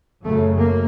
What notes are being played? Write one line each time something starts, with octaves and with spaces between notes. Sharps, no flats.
F#2 C#3 A3
A#3